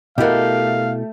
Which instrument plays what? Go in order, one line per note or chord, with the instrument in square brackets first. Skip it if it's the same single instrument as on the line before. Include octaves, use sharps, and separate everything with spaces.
[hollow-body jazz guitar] B2 E4 F#5 [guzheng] A3 G4 [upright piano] A#4 D#5 [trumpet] F5